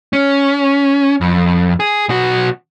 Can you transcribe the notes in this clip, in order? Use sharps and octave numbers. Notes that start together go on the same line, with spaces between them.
C#4
F2
G#4
B1 F#4